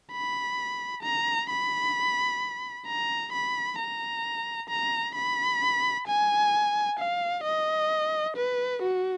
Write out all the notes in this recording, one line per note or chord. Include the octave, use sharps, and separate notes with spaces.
B5
A#5
B5
A#5
B5
A#5
A#5
B5
G#5
F5
D#5
B4
F#4